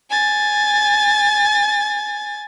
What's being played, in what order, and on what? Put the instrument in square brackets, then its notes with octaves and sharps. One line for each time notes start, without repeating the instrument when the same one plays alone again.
[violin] G#5 A6